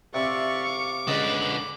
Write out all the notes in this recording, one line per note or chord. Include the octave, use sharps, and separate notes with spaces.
C3 D5 E5 F5 C#6
D6
C#2 D3 B4 D#5 A5